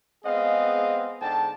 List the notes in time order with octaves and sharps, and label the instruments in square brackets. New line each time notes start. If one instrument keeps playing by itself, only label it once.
[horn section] G#3 B3 C4 G#4 D#5 F5
G#2 D3 G5 A5